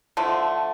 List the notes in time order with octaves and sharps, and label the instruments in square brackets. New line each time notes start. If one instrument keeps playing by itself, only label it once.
[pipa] D3 F3 A3